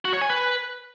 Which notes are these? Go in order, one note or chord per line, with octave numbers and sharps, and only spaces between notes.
F#4
C#5
G#5
B4